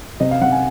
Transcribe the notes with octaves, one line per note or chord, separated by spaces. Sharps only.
C3 D#5
F5
C3 F#5
G#5